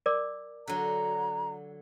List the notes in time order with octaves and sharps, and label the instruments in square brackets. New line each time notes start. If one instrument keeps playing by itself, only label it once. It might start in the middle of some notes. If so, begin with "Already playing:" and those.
[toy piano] A#4 D5 D6
[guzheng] D3 F#3 [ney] A#5